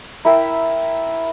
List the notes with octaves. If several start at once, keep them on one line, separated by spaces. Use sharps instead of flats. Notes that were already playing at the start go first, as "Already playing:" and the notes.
E4 A#4 E5 G5